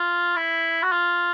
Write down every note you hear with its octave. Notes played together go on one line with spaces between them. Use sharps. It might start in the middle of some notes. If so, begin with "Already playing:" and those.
Already playing: F4
E4
F#4
F4